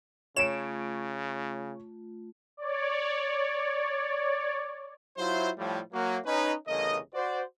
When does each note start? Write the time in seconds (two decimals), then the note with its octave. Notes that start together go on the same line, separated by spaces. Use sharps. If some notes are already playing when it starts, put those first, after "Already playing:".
0.36 C#3 A3 F4 C#5 D7 E7
2.57 C#5 D5
5.18 F#3 E4 F4 C5
5.58 A2 F3 G3
5.92 F#3 A#3
6.26 C#4 D#4 B4
6.68 G1 C#3 E3 A3 A#4 D#5
7.14 F#4 C5 D5